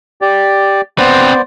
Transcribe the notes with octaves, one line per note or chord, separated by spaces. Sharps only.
G4 D5
B3 C4 B4 C5 D5